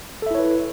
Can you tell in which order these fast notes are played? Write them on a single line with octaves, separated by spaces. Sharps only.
A4 E5 E4 C#5 B4